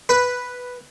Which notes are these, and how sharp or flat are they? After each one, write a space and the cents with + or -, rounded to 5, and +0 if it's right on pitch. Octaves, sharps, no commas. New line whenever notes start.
B4 +0